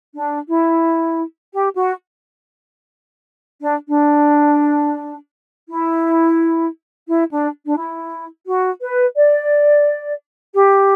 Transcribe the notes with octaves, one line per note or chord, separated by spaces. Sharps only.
D4
E4
G4
F#4
D4
D4
E4
E4
D4
D4
E4
F#4
B4
D5
G4